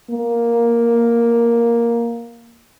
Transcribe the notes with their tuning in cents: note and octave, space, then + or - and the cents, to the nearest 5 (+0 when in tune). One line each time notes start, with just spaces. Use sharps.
A#3 +5